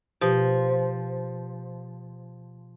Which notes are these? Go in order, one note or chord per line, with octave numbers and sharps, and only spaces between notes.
B2 F3 G4